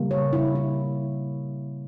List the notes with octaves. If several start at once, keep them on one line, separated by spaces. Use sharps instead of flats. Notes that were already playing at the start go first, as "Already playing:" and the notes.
Already playing: C#3 G3 A#3
C#5
E4
E4